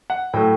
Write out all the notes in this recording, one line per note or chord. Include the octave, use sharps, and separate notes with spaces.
F#5
A2 F#3 A3 G5